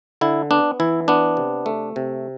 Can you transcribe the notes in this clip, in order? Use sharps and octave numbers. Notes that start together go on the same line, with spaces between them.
D3 E4
B3 D4
E3 E4
B3 D4
C3
A3
C3